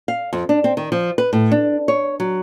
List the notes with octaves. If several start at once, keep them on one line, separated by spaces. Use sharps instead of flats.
F5
F2
D4
C4
D#3
F3
B4
A2
D4
C#5
F#3